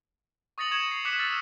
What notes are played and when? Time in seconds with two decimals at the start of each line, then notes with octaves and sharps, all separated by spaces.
0.58 C#6 D#6 A6 A#6 C#7 F#7
0.71 C#6 G#6 C#7 E7 F#7
0.91 C7
1.05 D6 F#6 B6 C#7
1.19 E6 F6 A6